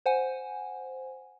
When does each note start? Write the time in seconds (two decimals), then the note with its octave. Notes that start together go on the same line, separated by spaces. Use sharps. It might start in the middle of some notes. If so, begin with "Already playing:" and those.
0.06 C5 F#5 G#5